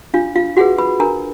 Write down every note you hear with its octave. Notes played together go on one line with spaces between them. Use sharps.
D4 F4 F5
F4 F5
F4 F#4 G#4 B4 F#5
B4 B5
D4 A#4 A#5